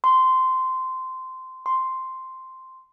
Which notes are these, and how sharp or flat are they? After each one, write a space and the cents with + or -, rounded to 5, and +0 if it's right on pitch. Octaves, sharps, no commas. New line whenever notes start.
C6 -15
C6 -5